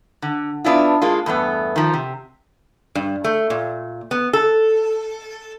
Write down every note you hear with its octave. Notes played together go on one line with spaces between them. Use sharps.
D3
B3 D4 E4 F4
G#3 A#3 F4
E2 G2 A3 B3
D#3 F3
C3
G2
A3
A#2
B3
A4